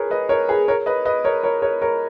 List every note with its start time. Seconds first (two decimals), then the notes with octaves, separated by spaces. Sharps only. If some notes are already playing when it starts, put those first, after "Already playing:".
Already playing: G#4 A#4 B4 C#5
0.11 B4 D#5
0.29 A#4 C#5
0.48 G#4 B4
0.68 A#4 C#5
0.86 B4 D#5
1.05 B4 D#5
1.24 A#4 C#5
1.43 A#4 C#5
1.62 A#4 C#5
1.82 A#4 C#5